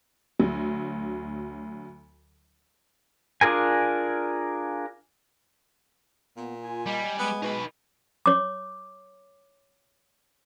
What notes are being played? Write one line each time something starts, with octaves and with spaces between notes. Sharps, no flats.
D2 F#3
D4 F4 G#4 A#4 G#5
A#2 B3
F4 G#5
G3 D#5
G#3 B3
B2 D#4 B4
C#5 D6